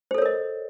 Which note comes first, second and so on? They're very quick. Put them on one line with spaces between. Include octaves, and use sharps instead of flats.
C5 A4 C#5 A#4 D#5